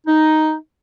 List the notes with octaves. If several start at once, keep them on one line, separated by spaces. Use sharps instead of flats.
D#4